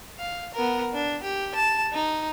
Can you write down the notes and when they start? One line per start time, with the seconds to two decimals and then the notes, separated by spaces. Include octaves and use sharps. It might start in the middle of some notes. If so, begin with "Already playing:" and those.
0.18 F5
0.54 B3 A#4
0.94 D4
1.23 G4
1.55 A5
1.92 D#4